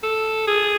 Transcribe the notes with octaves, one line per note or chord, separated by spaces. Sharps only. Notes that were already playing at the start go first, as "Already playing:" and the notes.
A4
G#4